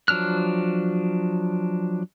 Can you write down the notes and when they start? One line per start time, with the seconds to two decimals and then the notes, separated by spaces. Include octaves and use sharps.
0.08 F3 F#3 D4 F6 F#6